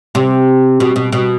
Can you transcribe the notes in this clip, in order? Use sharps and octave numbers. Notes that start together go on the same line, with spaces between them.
C3
B2
B2
B2